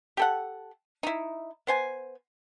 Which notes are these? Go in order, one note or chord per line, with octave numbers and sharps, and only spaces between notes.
G4 A4 F#5
D#4 E4
B3 C5 G#5